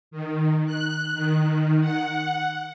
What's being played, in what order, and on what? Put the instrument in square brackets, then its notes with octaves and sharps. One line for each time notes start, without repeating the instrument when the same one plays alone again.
[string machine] D#3
F#6
D#3
F#5